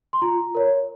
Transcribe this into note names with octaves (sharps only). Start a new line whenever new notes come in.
C6
F4 A#5
A#4 C#5